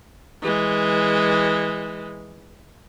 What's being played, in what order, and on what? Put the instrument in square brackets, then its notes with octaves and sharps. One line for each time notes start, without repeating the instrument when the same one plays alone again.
[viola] E3 G#3